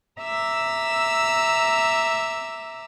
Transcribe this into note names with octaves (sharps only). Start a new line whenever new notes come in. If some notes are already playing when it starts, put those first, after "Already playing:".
E5 A#5 D6 E6